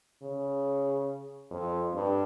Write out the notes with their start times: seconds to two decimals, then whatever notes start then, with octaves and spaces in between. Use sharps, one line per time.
0.22 C#3
1.51 F2
1.94 G2